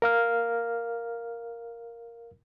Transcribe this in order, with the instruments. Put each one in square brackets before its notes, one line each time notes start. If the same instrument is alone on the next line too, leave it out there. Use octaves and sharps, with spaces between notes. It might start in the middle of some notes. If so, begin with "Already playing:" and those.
[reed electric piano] A#4 F5 F6